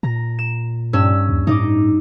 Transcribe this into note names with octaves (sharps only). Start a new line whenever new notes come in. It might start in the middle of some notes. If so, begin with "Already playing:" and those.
A#2 A#5 A#6
E7
G2 C#4 E6
D#2
A2 D#4 D#5 D6